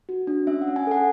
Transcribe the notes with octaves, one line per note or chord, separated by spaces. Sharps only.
F#4
D4
C#4 E5
F#5
C#4
G#5
A4 F#5